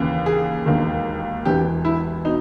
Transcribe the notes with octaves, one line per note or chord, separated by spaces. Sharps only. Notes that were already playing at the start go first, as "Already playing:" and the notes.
Already playing: D#2 C#3 E3
G#4
E1 D#2 D#3
E1 E2 C3 E3 G4
E4
B2 D#4